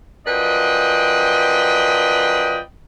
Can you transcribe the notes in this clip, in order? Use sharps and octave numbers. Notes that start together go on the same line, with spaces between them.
F#2 F3 B4 D5 D#5 G5